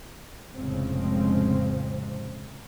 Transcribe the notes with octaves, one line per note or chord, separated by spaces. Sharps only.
F1 A2 C#3 F3 G#3 C4